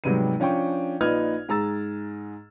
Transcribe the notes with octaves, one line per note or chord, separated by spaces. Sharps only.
G#2 C3 F#3 G3 B3 D#7
F3 C#4 D4 G5 C#6
A#1 A#2 D#4 B4 F6 G#6
G#2 G#4 A#5 E6 A6